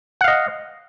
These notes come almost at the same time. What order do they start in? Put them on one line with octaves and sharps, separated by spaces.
F#5 F5 D#5